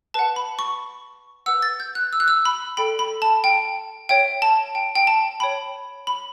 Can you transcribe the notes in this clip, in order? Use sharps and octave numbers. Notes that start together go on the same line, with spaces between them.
B4 F#5 A5
B5
C#6
B4 F#5 E6
A6
G6
F#6
E6
F#6
E6
B5
A4 D5 G5 B5
B5
A5
G5
C#5 E5 G5
A5
G5
G5
A5
C#5 G5 B5
B5